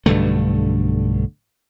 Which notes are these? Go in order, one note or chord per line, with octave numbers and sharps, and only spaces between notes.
B1 G2 D3 A3